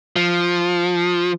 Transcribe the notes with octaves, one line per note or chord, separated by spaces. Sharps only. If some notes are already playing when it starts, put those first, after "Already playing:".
F3